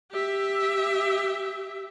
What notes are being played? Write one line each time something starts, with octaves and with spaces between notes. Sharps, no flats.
G4 E5